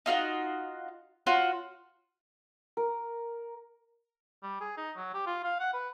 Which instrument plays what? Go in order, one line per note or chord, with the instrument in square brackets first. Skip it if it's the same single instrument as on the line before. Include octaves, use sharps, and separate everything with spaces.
[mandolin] D#4 F4 F#4 F5
F4 F#4 C#5
[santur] A#4
[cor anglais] G3
G#4
D#4
F#3
G4
F4
F5
F#5
B4